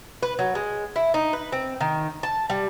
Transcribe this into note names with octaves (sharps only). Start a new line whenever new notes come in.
B4
F#3
G#3
E4
D#4
B4
C4
D#3
A5
G3